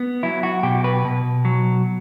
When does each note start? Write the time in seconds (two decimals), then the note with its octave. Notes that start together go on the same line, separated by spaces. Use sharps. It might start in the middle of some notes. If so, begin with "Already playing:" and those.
Already playing: B3
0.23 F#3 E4
0.43 F#4
0.63 B2 G4
0.84 B4
1.05 B2
1.45 F#3